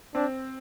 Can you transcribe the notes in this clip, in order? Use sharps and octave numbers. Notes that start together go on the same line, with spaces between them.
C4 D4